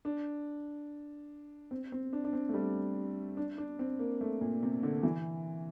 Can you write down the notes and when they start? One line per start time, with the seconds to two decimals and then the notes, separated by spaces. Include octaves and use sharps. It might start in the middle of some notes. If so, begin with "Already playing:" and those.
0.05 D4
1.71 C4
1.92 C4
2.13 D4
2.24 D4
2.33 C4
2.49 A3
2.54 G3
3.37 D4
3.58 D4
3.79 C4
3.99 A#3
4.21 A3
4.41 A#2
4.63 C3
4.83 D3
5.03 E3